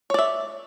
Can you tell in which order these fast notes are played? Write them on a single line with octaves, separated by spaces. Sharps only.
C#5 D5 E5